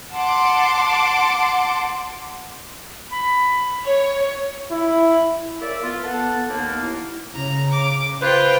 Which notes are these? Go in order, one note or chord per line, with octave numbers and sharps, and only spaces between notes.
F#5 A5 C6 D6
B5
C#5
E4
C#3 A#4 D5 E5
B3 F4
A4 F#5 A5
D#2 A#3 B3
E4
C#3 A#5
D6
F4 B4 C5 G5